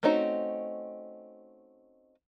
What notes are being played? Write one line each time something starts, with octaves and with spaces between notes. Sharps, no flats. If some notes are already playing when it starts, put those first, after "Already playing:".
A3 C4 C#4 D#4 F#4